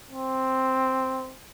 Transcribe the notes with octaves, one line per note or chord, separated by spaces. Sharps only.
C4